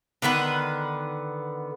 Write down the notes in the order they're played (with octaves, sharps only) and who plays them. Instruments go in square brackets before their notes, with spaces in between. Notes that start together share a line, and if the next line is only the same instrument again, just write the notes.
[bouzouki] D3 D#3 B3 B4